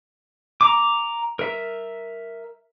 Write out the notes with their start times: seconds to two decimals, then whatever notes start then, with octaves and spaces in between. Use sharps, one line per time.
0.61 A#5 D6
1.39 A#4 E5